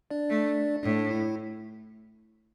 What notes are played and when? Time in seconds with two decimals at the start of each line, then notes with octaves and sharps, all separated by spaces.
0.11 D4 D5
0.29 A3
0.83 A2 D4
1.11 E4